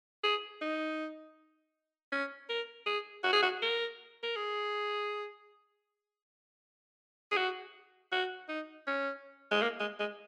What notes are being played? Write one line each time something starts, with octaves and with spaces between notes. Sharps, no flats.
G#4
D#4
C#4
A#4
G#4
F#4
G#4
F#4
A#4
A#4
G#4
G#4
F#4
F#4
D#4
C#4
G#3
A#3
G#3
G#3